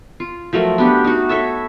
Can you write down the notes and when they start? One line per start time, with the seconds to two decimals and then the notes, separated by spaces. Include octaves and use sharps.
0.20 F4
0.53 F3 F#3 A3 A#4
0.78 B3 D4 G4
1.04 D#4 F#4
1.29 A4 C#5 E5 A5